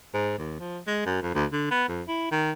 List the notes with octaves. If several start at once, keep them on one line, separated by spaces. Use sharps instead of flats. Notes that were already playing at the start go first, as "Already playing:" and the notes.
G#2
D#2
F3
G#3
F#2
F2
D2
D3
B3
F2
E4
D#3